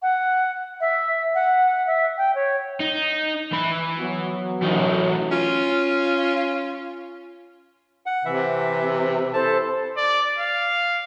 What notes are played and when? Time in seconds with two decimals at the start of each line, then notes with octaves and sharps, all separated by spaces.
0.02 F#5
0.80 E5
1.35 F#5
1.87 E5
2.17 G5
2.35 C#5
2.80 D#4
3.52 E3 B5
3.99 F#3 B3 F#4
4.62 A1 D3 E3 F#3 D#4
5.32 C#4 F4
8.06 F#5
8.25 C3 E3 E5
9.33 E4 A4 C5 A5
9.97 D5
10.38 F5